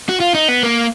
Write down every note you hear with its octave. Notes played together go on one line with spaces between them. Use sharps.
F#4
F4
D#4
B3
A#3